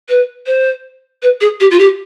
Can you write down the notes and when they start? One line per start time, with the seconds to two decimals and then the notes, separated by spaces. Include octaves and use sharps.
0.08 B4
0.46 C5
1.22 B4
1.41 G#4
1.60 G4
1.71 F4
1.79 G4